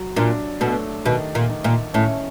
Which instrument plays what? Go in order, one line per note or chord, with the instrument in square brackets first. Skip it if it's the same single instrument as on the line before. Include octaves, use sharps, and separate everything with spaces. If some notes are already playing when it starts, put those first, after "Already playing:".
Already playing: [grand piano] F#3
[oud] A#2 [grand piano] D4
[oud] B2 [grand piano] A3
[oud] B2 [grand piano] D#3
[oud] A#2
[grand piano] D#3
[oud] A#2
[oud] A2 [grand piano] C#4